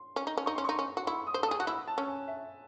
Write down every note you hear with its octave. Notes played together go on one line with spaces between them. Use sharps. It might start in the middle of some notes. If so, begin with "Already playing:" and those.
Already playing: C6
C#4
D#4
C#4
D#4 C#6
C#4 C6
D#4 C#6
C#4
F#4
E4 C#6
D#6
C5
A4
G#4 D#6
F#4 F#6
E4 E6
A5
C#4
G#5
E5